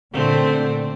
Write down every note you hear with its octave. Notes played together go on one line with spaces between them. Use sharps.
A#2 D3 A3 C4